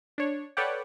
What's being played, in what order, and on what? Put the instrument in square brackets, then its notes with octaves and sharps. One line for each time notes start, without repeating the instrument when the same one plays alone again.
[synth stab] D4 C#5
A4 B4 C#5 D5 F#5 G5